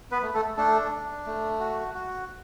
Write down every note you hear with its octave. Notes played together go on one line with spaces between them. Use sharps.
B3 B4
A3
A3 A4
A3 D4 A4
D4
A3
F#4
F#4